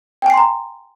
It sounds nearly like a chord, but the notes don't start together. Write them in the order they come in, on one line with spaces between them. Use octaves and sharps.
G5 G#5 C7 C6 A#5